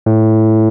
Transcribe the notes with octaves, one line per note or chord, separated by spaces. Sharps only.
A2